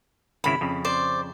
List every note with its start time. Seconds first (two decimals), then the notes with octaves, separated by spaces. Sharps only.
0.44 G#1 C#3 E4 B5
0.61 F2 C#3
0.85 C5 D5